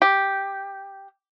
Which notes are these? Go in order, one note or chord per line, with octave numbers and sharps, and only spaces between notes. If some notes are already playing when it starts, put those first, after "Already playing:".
G4